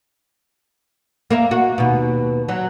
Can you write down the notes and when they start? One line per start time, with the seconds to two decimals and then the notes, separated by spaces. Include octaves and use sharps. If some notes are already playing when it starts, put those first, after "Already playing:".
1.30 A#3 A#4 E5
1.51 F#4
1.78 D#2 B2
2.49 F#3